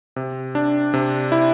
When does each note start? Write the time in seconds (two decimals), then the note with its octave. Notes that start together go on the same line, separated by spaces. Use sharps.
0.16 C3
0.55 D4
0.94 C3
1.32 E4